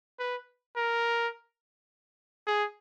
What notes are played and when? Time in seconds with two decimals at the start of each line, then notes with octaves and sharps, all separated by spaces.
0.19 B4
0.76 A#4
2.47 G#4